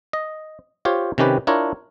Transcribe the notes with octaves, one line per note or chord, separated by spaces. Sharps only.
D#5
F4 G4 C5 C#5
C3 D#3 C#4 G4 B4
D4 E4 F4 A#4 C#5